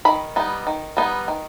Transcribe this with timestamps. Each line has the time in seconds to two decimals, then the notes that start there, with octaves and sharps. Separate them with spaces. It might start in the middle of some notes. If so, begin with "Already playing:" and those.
0.05 D#3 B5
0.36 G3 B3 D#4
0.67 D#3
0.97 G3 B3 D#4
1.28 D#3